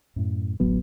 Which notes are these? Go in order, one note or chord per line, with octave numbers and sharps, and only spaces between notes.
F#2 A2
D1 A1 F#3 B3